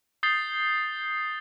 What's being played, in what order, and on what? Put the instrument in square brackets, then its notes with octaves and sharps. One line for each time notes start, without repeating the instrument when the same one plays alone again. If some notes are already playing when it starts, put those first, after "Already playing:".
[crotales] D#6 G6 A6 C7 G7